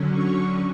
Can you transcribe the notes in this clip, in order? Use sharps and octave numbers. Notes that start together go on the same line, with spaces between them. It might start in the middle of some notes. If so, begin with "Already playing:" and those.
Already playing: D3 F#3 C#4
C#5